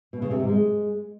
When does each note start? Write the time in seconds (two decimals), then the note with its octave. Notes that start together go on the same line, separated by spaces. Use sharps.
0.13 B2
0.22 C#3
0.31 C3
0.40 G#2
0.49 G#3